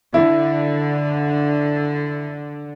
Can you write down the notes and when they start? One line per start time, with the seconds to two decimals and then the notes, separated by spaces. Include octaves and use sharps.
0.14 D3 E4